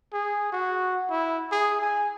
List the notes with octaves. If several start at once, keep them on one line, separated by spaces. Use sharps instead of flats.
G#4
F#4
E4
G#4
G#5